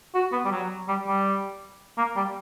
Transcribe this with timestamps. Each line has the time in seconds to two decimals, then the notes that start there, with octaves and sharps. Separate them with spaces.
0.15 F#4
0.32 B3
0.45 G3
0.52 F#3
0.88 G3
1.07 G3
1.98 A#3
2.16 G3